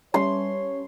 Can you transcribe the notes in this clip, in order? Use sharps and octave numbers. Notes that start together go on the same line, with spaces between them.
G3 C#4 C#5 C6